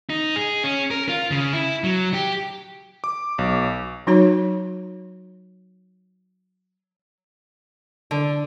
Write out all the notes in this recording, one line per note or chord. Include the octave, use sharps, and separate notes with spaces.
D#4
G#4
C#4
A#4
F4
C#3
E4
F#3
G4
D6
B1
F#3 D#4 F#4 C#5 A#5
D3